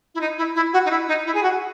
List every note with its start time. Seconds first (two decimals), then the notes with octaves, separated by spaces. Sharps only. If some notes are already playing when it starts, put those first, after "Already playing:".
0.14 E4
0.20 D#4
0.37 E4
0.55 E4
0.73 F#4
0.85 D#4
0.90 E4
1.08 D#4
1.26 E4
1.34 G#4
1.42 F#4